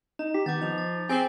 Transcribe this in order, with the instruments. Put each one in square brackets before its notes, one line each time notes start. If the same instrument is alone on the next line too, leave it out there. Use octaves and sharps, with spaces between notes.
[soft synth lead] D#4 [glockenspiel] A#5
[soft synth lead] G4 [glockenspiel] B6
[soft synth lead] D#3 [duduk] B3 [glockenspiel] D6 G6 A6
[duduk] F3 [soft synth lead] D#4 [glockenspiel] G6 F7
[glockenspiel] A6
[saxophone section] C4 [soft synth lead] G#4 [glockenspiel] G#5 B6 F#7